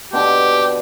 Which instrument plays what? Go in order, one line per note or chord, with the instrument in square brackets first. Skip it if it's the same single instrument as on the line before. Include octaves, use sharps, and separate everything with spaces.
[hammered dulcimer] B2 D3 [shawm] G4